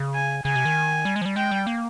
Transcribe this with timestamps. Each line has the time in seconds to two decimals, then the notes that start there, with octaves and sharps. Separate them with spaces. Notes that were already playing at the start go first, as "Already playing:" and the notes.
Already playing: C#3
0.14 G#5
0.45 C#3 G#5
0.55 C3
0.65 D#3
1.05 G3
1.16 G#3
1.22 F3
1.26 G3
1.36 G#3 G5
1.51 G3
1.67 A#3